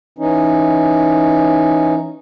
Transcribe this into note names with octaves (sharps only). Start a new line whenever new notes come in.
E3 C#4 D#4